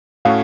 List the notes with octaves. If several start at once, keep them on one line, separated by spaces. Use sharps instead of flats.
A2 A3 C#4 F#4 A4 F5